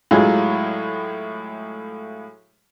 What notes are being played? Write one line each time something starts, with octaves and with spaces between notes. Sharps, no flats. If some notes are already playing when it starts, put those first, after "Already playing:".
A2 F#3 G#3 E4 F4 G#4